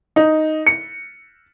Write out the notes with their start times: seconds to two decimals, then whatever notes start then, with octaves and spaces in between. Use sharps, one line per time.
0.16 D#4
0.67 C#7